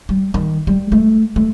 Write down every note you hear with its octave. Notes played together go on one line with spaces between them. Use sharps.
G3
D#3
G3
A3
A3